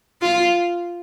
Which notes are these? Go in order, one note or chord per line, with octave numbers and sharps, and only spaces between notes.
F4